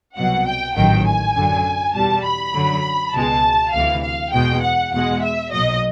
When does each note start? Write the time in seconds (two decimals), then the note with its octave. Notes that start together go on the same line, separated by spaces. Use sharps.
0.16 C2 B2 F#3 F#5
0.46 G5
0.75 A1 G#2 D#3 F#3 G5
1.05 G#5
1.35 F#2 D3 F#3
1.94 E2 B2 G3 A5
2.24 B5
2.54 F#2 D3 F#3
3.13 C#2 B2 G#3 A5
3.72 D2 C3 E3 F5
4.02 F5
4.32 E2 B2 G#3 G5
4.62 F#5
4.92 E2 B2 G#3 F#5
5.22 E5
5.51 B1 A#2 F#3 D#5